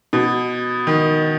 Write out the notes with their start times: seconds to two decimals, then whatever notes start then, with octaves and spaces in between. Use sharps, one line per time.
0.13 B2
0.87 D#3